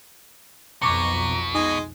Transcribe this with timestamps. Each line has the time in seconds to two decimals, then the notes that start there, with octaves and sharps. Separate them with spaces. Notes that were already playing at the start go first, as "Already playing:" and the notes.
0.82 B1 F2 B2 A#5 C#6 D6 C#7
1.54 G#3 D#4 D#5 G#5